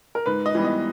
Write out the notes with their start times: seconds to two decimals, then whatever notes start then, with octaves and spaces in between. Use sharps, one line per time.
0.15 A#4
0.26 G#2 B4
0.46 D#5
0.55 E3 G3 B3
0.65 D#5